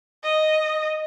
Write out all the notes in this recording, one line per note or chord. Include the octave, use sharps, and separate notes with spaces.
D#5